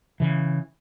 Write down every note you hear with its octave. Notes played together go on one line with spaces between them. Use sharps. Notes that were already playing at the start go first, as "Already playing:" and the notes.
C#3 E3